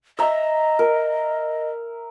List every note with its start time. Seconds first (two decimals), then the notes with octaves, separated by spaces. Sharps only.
0.19 D#5 E5 A#5
0.79 A#4